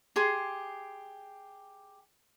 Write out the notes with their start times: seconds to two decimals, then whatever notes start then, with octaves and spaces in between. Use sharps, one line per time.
0.16 G4 G#4 C6